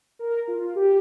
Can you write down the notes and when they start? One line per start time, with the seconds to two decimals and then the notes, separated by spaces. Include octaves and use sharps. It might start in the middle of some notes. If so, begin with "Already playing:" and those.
0.19 A#4
0.48 F4
0.76 G4